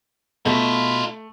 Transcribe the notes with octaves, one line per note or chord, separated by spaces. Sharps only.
B2 A3 D#4 F4 B5